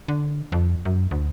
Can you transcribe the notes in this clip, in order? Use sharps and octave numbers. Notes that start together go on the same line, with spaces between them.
D3
F2
F#2
D2